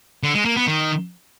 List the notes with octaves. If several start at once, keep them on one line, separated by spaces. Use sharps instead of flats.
D3
G#3
A#3
B3
D#3